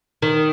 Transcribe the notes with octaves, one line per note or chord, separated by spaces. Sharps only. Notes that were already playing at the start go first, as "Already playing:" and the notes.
D#3